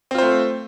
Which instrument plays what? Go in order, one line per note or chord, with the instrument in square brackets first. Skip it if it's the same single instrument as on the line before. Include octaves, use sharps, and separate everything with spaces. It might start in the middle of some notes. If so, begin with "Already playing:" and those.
[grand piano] C4
F4
C5
A3